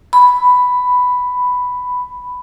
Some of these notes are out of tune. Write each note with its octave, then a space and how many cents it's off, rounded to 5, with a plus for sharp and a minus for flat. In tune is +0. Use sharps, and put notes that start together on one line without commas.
B5 +5